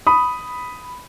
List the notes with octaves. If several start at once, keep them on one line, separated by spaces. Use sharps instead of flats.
B5 D#6